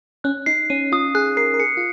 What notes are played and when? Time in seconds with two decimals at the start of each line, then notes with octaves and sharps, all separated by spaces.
0.24 C#4 F#6
0.46 D#4 C7
0.70 C#4 D#7
0.92 F4 D#6
1.15 G#4 F#6
1.37 A#4 C7
1.54 A#4
1.59 G#4 C#7
1.77 F4